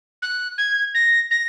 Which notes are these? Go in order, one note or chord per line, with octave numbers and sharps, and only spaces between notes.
F#6
G#6
A#6
A#6